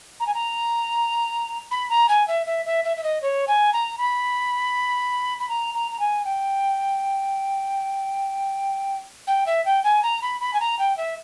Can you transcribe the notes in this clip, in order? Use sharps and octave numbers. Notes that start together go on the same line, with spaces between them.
A#5
G#5
A#5
B5
A#5
G#5
E5
E5
E5
E5
E5
D#5
C#5
G#5
A#5
B5
B5
A#5
A#5
A#5
G#5
G5
G5
E5
G5
G#5
A#5
B5
B5
G#5
A#5
G5
E5